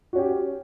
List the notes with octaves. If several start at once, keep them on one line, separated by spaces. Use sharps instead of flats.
C#4 F#4 G4